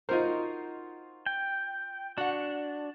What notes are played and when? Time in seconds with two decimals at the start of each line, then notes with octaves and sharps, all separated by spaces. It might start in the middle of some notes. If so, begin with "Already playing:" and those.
0.09 D#4 F4 F#4 A#4 C5
1.26 G5
2.18 D4 F#4 F#5